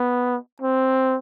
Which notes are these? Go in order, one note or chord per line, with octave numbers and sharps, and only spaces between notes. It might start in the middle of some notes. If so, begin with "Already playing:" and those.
Already playing: B3
C4